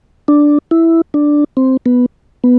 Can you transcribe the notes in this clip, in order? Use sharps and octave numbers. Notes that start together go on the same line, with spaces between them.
D4
E4
D4
C4
B3
B3